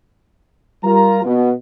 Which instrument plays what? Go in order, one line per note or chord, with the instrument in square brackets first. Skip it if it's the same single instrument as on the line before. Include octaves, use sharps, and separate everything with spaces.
[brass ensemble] G3 F4 A#4 A#5
B2